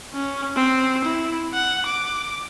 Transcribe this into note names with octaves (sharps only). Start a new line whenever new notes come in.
C#4
C4
E4
F#5
D6